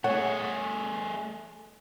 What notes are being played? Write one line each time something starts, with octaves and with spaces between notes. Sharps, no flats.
A3 G#4 C#5 F#5